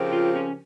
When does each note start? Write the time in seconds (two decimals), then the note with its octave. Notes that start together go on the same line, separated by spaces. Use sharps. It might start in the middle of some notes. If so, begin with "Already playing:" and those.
Already playing: C#3 F3 C4 G4 A#4
0.13 F4
0.35 C#4